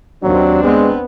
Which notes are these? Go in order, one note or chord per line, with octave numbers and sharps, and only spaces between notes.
D#2 F#3 C4 D4
G#3 B3